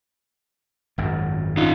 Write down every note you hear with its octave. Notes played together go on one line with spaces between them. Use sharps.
G#1 F#2
D#4 F4